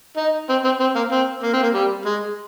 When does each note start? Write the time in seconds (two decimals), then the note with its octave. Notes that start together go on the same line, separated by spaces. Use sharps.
0.17 D#4
0.49 C4
0.65 C4
0.80 C4
0.96 A#3
1.12 C4
1.43 A#3
1.53 C4
1.63 A#3
1.74 G3
2.06 G#3